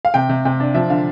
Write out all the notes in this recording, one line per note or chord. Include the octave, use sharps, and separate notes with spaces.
F5
C3 G5
C3
C3 G5
D4
F3 E5
D3 F5